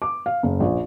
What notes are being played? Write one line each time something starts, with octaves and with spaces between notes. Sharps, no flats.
D6
F5
F#1
A#1